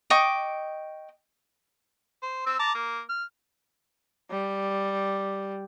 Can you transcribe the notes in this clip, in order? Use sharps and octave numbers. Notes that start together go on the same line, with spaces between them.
D#5 G5 C#6 D6
C5
C4 E6
A5 A#5 D6
A#3
F6
G3